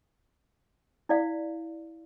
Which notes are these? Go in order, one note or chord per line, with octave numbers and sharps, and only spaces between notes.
E4 D5 F5